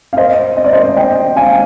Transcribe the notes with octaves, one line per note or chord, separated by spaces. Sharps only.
F5
C5 D#5
D#5
D5
C5 D#5
D#5 G5
F5 G#5